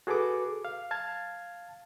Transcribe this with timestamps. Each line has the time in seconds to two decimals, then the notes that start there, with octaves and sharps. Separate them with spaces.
0.07 F#4 G#4 A4 B4 D6
0.65 F5
0.91 F5 A5 G#6